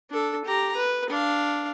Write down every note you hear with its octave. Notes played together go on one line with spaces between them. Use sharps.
D4 A4
G4 A#5
B4
D4 F5